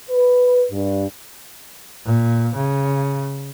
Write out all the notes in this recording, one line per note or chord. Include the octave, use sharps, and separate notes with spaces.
B4
G2
A#2
C#3